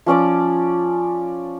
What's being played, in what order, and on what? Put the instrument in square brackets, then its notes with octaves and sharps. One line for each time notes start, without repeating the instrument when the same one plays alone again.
[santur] F3 C#4 D5 D6